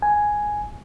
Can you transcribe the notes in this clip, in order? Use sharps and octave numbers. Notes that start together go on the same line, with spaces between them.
G#5